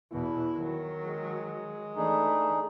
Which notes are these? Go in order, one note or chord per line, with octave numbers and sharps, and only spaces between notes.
E2 B2 E4
D#3 F#3
G#3
E3 A3 D4 D#4 G#4